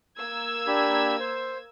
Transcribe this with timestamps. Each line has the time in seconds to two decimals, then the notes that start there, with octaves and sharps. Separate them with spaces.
0.18 A#3 E6 G#6
0.67 D4 G4 B5
1.20 C5